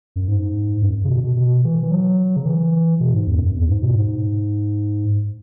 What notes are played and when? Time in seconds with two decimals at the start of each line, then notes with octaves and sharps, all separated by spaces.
0.16 F#2
0.28 G#2
0.82 F#2
1.04 C#3
1.09 B2
1.24 B2
1.36 B2
1.64 E3
1.83 E3
1.91 F#3
2.36 C#3
2.46 E3
3.00 B2
3.13 G#2
3.27 E2
3.40 F#2
3.54 E2
3.68 G#2
3.82 B2
3.95 G#2